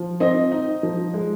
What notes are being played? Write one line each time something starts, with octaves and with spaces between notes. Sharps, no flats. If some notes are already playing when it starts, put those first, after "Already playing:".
Already playing: F3
C4 D#5
D#4
F3
G#3